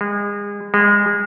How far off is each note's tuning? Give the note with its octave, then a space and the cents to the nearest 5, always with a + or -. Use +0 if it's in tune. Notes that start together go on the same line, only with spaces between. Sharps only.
G#3 -30
G#3 -25